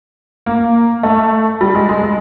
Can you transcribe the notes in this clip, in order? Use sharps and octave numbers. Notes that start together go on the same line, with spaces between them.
A#3
A3
G3
G#3
G#3
G#3